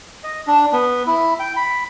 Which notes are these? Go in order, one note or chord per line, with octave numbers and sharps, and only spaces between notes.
D#5
D4
B3
E4
G5
B5